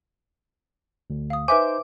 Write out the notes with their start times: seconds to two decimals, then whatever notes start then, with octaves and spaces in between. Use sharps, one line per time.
1.10 D2
1.30 F5 D#6
1.48 D#4 B4 C5 E5 G#5 D6